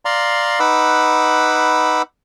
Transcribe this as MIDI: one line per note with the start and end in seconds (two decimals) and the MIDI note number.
0.05 0.59 74
0.05 0.59 77
0.05 0.59 82
0.05 0.59 84
0.60 2.02 63
0.60 2.02 71
0.60 2.02 78
0.60 2.02 83
0.60 2.02 86
0.60 2.02 88